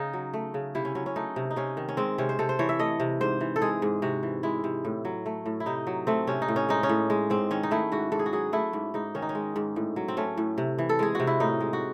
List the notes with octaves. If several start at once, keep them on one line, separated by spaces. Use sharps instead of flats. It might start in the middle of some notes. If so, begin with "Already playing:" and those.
Already playing: C#3 D#4
F#3
A3
C#3
C3 E4
C#4
F#3 C#4
C#4
A3 D#4
C3
D#4
C3 C#4
D#3
C#4
G#3 C4
C3 C#4
C5
C3 A4
C5
E3 C#5
E5
A3 D#5
C3
G#2 C5
E3
A4
G#3 G#4
G#2
C3 F#4
E3
G#3 E4
C3
A2
F#3
A3
A2
E4
C3 D#4
F#3
A3 C4
C3 C#4
D#4
A2
C#4
G#3 D#4
C#4
A2
G#3
G#2 C4
D#3 C#4
D#4
A3 E4
G#2 F#4
G#2 A4
G#4
F#4
F#3 G#4
A3 E4
G#2
G#2 D#4
D#3 C#4
D#4
C#4
G#3
G#2
A2
F#3
C4
A3 C#4
A2
C3
E3
A4
G#3 G#4
C3 F#4
E4
A2 D#4
G#3
F#4